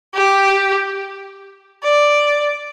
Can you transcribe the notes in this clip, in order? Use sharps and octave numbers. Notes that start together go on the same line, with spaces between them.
G4
D5